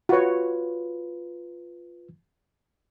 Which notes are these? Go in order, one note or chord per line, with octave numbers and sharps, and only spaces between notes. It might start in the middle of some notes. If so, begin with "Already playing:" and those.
F4 F#4 B4 C#5